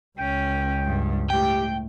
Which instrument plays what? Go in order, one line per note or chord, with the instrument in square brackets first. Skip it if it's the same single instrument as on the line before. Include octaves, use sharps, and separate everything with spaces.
[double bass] C#2 [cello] C#4 [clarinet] G5
[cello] G2
[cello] A2 [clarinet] G4 [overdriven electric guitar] G5